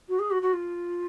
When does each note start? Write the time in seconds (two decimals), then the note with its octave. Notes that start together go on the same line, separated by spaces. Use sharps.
0.08 F#4
0.19 G#4
0.30 F#4
0.42 F#4
0.53 F4